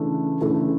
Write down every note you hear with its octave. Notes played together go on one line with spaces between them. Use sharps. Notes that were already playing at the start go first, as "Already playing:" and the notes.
Already playing: C#3 E3 A3 D4 A4
C#3 E3 A3 D4 A4